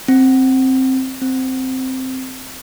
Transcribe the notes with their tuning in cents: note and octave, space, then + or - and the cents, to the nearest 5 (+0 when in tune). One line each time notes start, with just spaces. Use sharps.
C4 +5
C4 -5